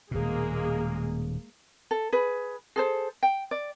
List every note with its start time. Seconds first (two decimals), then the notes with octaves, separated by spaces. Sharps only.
0.11 D#1 B2 G#3 A#3 G#4
1.91 A4
2.12 G#4 B4
2.76 G#4 A4 C5
3.23 G5
3.51 D5